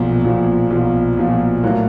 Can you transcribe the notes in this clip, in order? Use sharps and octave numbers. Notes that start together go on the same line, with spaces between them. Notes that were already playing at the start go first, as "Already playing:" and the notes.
Already playing: B1 A#2 F3
B1 A#2 F3
B1 A#2 F3
B1 A#2 F3
A2 F#3 A#3